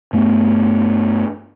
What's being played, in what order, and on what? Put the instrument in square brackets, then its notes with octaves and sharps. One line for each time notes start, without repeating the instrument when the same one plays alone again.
[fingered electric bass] G2 A3 B3